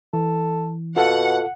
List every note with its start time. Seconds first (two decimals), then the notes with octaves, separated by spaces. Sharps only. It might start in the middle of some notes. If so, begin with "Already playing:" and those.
0.13 E3 A4
0.96 B2 F4 A4 F5 F#5